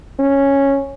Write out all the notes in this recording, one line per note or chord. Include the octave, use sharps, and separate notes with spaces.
C#4